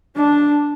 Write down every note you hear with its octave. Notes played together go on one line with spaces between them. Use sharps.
D4